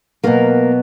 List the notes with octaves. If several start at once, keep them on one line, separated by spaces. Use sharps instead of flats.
B2 F#3 A#3 B3 A#4